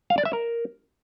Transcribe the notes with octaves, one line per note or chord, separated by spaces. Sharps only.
F5
D5
E5
A#4